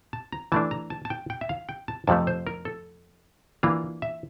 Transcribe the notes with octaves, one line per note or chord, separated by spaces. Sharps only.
A5
A#5
E3 A3 D4 A5
A#5
A5
A5
G5
G5
E5
F5
G5
A5
F2 C3 F3 A3 A5
C5
A#4
A4
E3 A#3 D4 F4 F5
E5